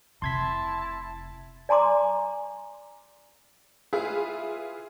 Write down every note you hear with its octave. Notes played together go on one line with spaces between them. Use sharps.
F1 C3 E4 A5 C6 G#6 B6
D5 G#5 A#5 C6 D6
E4 F4 G#4 B4 E5